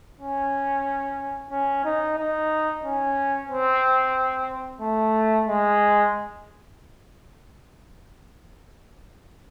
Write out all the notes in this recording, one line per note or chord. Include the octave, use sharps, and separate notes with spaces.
C#4
C#4
D#4
D#4
C#4
C4
A3
G#3